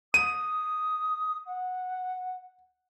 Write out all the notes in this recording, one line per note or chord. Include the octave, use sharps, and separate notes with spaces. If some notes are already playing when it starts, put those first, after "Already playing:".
D#6 D#7
F#5